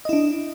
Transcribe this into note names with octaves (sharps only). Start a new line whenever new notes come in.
D4 E4 D#5